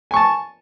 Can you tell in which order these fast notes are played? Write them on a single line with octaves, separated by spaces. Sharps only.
G#5 C#6 A5